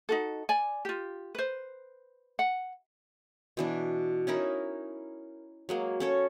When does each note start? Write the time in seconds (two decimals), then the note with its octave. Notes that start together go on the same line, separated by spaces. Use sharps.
0.09 D#4 F#4 A4
0.49 D5 G#5
0.85 F4 G4
1.35 B4 C5
2.39 F#5
3.57 B2 E3 D4
4.27 C#4 D#4 E4 A#4
5.69 F#3 G#3 A#3
6.00 C#4 A4 C#5